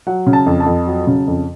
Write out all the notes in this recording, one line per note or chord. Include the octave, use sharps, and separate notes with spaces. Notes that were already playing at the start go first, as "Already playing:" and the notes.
F#3 F#5
C#3
A5
F2
A5
F2
F#3
C#3
F2